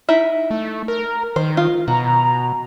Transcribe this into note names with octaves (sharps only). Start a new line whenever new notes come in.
D#4 E4 E5
A3
A#4
D#3 C5
F4
B2 F#4 A#5